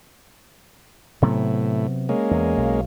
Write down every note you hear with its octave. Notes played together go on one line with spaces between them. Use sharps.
A2 C3 F#3 B3
G#3 A#3 C#4
E2
B1